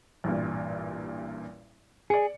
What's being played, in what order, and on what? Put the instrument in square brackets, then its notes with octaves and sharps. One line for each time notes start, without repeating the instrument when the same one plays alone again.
[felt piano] A1 G2 A#2
[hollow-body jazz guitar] G#4 [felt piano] D5 C#7